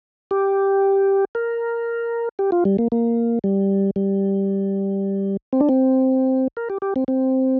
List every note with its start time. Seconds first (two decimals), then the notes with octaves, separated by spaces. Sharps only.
0.31 G4
1.35 A#4
2.39 G4
2.52 F4
2.65 G3
2.79 A#3
2.92 A#3
3.44 G3
3.96 G3
5.53 C4
5.61 D4
5.69 C4
6.57 A#4
6.70 G4
6.82 G4
6.96 C4
7.08 C4